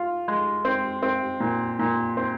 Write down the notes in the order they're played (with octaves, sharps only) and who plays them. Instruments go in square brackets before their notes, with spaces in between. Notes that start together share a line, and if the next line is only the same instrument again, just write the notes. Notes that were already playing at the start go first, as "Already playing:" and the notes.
Already playing: [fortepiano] F4
G#3
C4
C4
A#2
A#2
C4